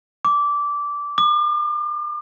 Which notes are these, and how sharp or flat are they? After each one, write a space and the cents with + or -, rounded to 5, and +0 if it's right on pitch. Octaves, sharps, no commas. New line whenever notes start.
D6 -15
D6 +40